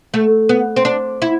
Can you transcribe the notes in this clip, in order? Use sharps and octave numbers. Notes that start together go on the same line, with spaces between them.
A3
B3
C4
D4
E4